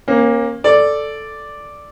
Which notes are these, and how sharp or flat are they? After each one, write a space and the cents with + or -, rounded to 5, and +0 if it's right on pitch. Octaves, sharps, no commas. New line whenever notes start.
A#3 +10 C#4 -35
A4 +0 D5 +0